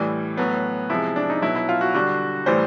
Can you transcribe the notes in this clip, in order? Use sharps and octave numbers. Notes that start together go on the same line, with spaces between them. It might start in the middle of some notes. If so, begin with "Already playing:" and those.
Already playing: A2 E3 G3
A2 F#3 B3
C3 F3 G#3 E4
D4
D#4
B2 F#3 E4
E4
F4
F#4
D3 G3 F#4
A2 E3 G3 C5